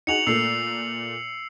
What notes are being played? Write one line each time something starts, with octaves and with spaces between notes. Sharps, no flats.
D#4 F#4 G#4 C#7 F7 F#7
A#2 A3 A#3 E6 C7
E6